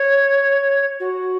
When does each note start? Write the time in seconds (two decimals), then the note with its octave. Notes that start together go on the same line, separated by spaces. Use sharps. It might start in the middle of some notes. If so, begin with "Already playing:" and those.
Already playing: C#5
1.00 F#4